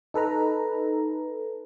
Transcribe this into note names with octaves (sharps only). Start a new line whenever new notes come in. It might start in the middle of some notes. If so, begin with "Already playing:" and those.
D#4 A4 B4 A#5